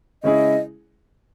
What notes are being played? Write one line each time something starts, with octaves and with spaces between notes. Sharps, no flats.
C#3 G#3 C#4 E4 G#4 D#5